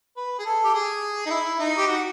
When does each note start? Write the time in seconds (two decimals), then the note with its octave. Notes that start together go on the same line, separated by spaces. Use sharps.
0.16 B4
0.39 G#4
0.45 A4
0.65 G4
0.74 G#4
1.26 D#4
1.30 E4
1.60 D#4
1.78 G4
1.88 F#4